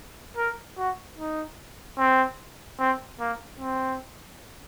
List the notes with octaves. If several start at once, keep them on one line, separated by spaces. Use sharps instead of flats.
A#4
F#4
D#4
C4
C4
A#3
C4